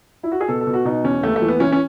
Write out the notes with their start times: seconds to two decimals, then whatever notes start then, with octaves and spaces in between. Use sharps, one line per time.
0.23 E4
0.32 F#4
0.41 G#4
0.48 B2 A4
0.61 A4
0.67 B2
0.74 F#4
0.85 B2 D#4
1.04 E2 C#4
1.23 D#2 A3
1.36 A3
1.42 E3
1.48 B3
1.60 E3 C#4
1.72 C#4